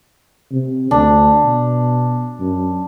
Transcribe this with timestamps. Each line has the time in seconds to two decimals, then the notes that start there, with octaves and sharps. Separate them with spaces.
0.51 C3
0.91 D2 D4
1.43 B2
2.40 F#2